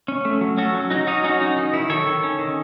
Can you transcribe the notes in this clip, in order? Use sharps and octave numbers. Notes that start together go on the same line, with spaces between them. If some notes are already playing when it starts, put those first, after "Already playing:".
C#4
A3
F#3
C#4 F#4 A4
F#3
F#3 D#4 F#4
C#4 D#4 F#4
C#4 D#4 F#4
F#3 D#4 F#4
D#3 D#4
D#3 E4
D#3 A4 C#5
D#3
C#4
D#3